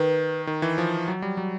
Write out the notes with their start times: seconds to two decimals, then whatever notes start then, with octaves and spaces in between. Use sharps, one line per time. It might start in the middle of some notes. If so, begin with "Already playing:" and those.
Already playing: D#3 B4
0.47 D#3
0.62 E3
0.78 F3
1.08 F#3
1.22 G3
1.37 F#3